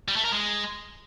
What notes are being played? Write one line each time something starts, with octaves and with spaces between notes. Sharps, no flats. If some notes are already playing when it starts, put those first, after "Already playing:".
G3
A3
A#4
G#3